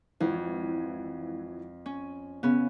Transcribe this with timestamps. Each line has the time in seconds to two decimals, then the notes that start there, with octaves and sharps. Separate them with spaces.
0.20 G#1 F2 E3 F3
1.86 C#4
2.43 C#3 B3 C#4